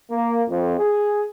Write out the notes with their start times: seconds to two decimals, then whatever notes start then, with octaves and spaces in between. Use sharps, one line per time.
0.10 A#3
0.48 F2
0.77 G#4